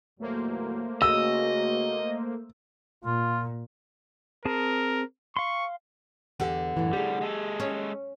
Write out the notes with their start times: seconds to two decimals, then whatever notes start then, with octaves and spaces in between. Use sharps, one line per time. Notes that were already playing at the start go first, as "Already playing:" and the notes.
0.20 E2 A#2 F#3 A3 A#3 C5
1.02 C#3 F#4 D#5 E6
3.04 A#2 F4
4.45 C4 G#4 A#4 A5
5.37 F5 C6 C#6
6.40 E2 D3 G4
6.77 F#2 A2 E3
6.93 A2 G3 G4 G#4
7.21 G#3 A4
7.60 C#4